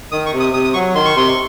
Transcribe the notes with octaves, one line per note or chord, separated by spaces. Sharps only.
D#3 D#6
C#6
C3
D#6
C3 D#6
D#6
F#3 C#6
D#3 C6
C#6
C3 C6
C#6